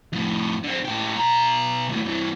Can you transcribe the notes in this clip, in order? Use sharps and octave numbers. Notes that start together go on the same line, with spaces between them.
F2 A2
D3 C4
A2 G4
B2 A#5
D#2 A2
G2 E3